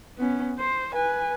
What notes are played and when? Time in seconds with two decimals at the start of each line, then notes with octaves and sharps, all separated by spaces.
0.18 B3 C#4
0.59 C5
0.93 B4 G#5